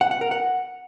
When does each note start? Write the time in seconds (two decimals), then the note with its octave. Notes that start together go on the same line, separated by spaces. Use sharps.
0.01 F#5
0.11 F#5
0.21 A#4
0.31 F#5